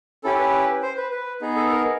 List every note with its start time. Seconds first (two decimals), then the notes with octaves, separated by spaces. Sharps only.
0.24 C#4 E4 G4 A4
0.39 B4
0.83 C5
0.97 B4
1.12 B4
1.41 B3 D#4 G#4
1.56 A4
1.70 A#4